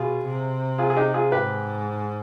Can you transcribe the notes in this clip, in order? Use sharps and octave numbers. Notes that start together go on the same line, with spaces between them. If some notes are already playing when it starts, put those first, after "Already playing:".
Already playing: B2 F4 G#4
C3
F4 G#4
G#4
D#4 G4
F4 G#4
G#2 G4 B4